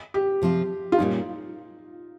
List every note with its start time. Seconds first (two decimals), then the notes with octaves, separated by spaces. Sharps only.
0.14 G4
0.42 C3 F3 C4 F4
0.92 F4
0.98 A#2 G3 C#4 D#4